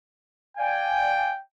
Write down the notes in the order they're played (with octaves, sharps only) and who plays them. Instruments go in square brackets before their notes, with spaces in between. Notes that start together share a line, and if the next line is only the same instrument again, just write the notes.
[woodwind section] D5 F5 G#5 [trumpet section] G5